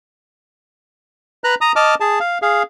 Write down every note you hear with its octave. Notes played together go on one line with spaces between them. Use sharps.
B4 A#5 F#6
A#5 D#6
D#5 A5 D6 F6
G#4 A5
F5
G#4 F5